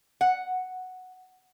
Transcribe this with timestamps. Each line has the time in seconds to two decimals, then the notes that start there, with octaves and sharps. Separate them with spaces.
0.21 F#5